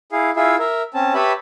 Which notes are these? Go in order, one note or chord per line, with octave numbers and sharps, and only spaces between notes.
E4 G#4 F5
E4 F4 G#4 E5 F5
A#4 E5
C4 C#4 A5
G4 B4 C#5 E5 A5 B5